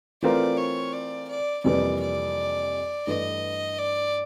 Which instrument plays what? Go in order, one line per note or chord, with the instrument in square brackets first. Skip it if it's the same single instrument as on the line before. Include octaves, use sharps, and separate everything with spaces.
[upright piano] E3 A3 C4 F4 A#4 [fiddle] D5
[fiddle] C#5
D5
D5
[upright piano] F2 C3 E3 G3 A#3 [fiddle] D5
[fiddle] D5
[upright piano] G2 E3 A3 [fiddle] D#5
[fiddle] D5